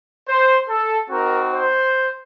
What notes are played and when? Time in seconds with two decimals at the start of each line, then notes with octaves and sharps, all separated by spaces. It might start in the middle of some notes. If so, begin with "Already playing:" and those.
0.29 C5
0.69 A4
1.10 C4 D#4 F#4 A#4
1.52 C5